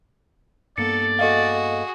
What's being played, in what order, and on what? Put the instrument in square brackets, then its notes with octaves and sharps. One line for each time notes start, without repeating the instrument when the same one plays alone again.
[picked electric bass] G2 A#3 B3 [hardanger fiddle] A4 [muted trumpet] D5 [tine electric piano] C#7
[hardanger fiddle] F#4 G#4 [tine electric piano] A4 D#5 F5